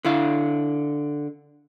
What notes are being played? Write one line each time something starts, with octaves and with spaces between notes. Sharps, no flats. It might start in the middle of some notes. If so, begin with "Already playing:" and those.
D3 E4 F5